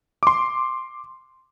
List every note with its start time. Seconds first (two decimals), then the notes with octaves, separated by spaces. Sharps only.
0.23 C6 D6